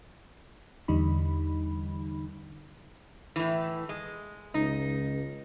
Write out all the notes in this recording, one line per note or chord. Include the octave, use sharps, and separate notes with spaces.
E2 D3 G3 D#4 B5
A2 E3
G#3
C#2 D#4